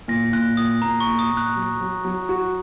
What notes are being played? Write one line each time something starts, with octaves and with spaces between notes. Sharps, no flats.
A#2 A#6
A#2 F#6
A#2 D#6
A#2 A#5
C#6
A#2
D#6
A#2
F#6
F#3
F#3
F#3
F#4